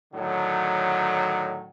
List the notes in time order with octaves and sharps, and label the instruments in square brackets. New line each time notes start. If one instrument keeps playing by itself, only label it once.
[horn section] A2 D3 D#3 F#3